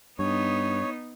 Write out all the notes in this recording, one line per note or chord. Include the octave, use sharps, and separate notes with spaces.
G2 B3 D#4 C#5